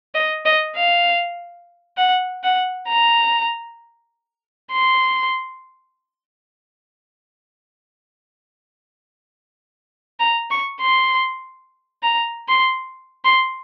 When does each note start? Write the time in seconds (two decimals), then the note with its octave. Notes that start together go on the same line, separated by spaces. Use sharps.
0.15 D#5
0.45 D#5
0.76 F5
1.98 F#5
2.44 F#5
2.89 A#5
4.72 C6
10.20 A#5
10.51 C#6
10.81 C6
12.03 A#5
12.49 C6
13.25 C6